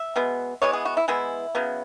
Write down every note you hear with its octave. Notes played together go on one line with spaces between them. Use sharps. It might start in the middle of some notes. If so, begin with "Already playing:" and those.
Already playing: E5
B2 G#3 B3
E3 G#3 B3 C#5
G#4
F#4
E4
E3 G#3 B3 E4
C#3 F#3 B3